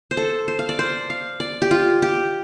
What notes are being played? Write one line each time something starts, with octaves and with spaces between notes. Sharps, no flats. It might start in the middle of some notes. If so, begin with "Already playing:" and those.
C5
A4
C5
F5
D5
C5
F5
D5
G4
F4
G4